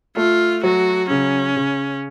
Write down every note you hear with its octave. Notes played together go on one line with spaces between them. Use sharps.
A3 F4
F#3 F#4
C#3 C#4
C#3